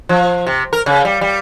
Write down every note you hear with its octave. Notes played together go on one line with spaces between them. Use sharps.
F3
C3
A#4
C#3
G3
G3